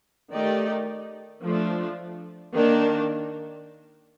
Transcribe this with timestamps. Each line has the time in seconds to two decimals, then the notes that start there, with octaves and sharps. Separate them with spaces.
0.31 D#3 A3 D#4 G4 D5
1.42 F3 A3 D4
2.55 D#3 A#3 D4